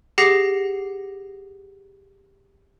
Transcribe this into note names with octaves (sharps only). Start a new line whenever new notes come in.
G4 G#4 F#5 A#6 C7